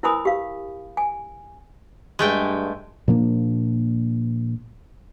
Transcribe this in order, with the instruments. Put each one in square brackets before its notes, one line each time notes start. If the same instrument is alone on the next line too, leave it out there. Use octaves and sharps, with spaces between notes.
[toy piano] E4 A#4 C5 G#5 B5 D#6
G4 F5
G#5
[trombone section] G2 [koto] G#3 A3 G5
[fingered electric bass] A#2 F3 A#3 D4